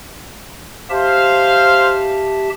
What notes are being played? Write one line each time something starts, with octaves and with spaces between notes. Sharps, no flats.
G4 C5 E5 F5 A5